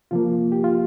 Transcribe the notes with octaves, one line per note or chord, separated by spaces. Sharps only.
C3 F3 A#3 F4
G4
F4